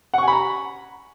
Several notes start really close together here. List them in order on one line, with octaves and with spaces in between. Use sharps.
F#5 C#6 G#5 B5 A#5